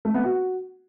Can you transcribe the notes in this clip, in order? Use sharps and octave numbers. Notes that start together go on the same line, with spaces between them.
A3
B3
F#4